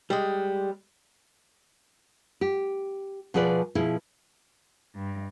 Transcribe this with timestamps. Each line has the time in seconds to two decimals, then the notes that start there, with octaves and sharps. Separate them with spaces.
0.10 G3 G#3
2.41 G4
3.34 B2 F3 G#4 B4 D5
3.75 B2 F3 E4 G#4
4.96 G2